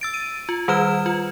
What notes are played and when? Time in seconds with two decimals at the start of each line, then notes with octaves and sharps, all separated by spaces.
0.01 E6 A6 D7
0.14 D#7
0.49 F4
0.68 D#3 G3 B4 F6 E7
1.06 F4